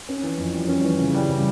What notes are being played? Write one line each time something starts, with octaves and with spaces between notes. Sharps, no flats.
C#4
E3
F2
G3
C#4
E3
C#3
G3
C#3